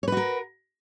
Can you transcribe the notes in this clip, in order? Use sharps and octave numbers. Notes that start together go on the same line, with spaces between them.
F#4 A#4 B4 C#5